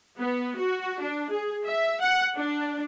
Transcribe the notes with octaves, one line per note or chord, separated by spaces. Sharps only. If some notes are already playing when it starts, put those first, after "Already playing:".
B3
F#4
D4
G#4
E5
F#5
D4